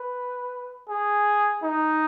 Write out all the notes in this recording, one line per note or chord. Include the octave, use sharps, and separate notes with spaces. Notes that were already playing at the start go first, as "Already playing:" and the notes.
Already playing: B4
G#4
D#4